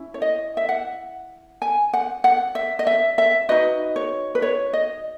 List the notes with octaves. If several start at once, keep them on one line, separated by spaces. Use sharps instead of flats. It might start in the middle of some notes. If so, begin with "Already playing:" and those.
Already playing: C#4 E4
C#5
D#5
E5
F#5
G#5
F#5
F#5
E5
D#5
E5
E5
D#4 F#4 B4 D#5
C#5
B4
C#5
D#5